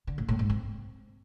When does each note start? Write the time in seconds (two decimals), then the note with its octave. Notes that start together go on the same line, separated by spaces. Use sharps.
0.07 D3
0.18 A2
0.28 A2
0.39 G#2
0.50 C4